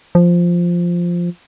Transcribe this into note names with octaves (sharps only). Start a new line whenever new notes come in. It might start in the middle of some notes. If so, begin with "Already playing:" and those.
F3